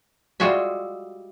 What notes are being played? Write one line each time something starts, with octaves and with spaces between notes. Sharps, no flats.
G3 G#3 F4 F#4 G#4 E5